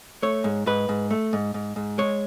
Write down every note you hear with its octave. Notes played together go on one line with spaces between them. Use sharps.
A3 C#5
G#2
G#2 B4
G#2
A3
G#2
G#2
G#2
G#3 C#5